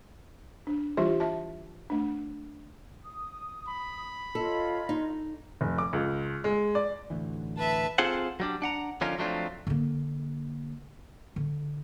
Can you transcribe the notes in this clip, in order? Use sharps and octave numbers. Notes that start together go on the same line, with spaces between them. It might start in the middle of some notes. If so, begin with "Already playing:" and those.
D4
E3 G3 E4 F4 G4 E5
E5 A5
A3 D4
D#6
B5
F4 A4 C#5 D#5
D#4
F1
D6
C#2
G#3
D5
A1 D2 E3
B4 E5 A5
C4 F4 G#4 A4 C5 F#5
F#3 G3 D4
D4 F#5 A#5
D3 F3 C#4 D#4 F4 A#4
F3 F#3 A3 C4 D4 F4
D3 A#3
D3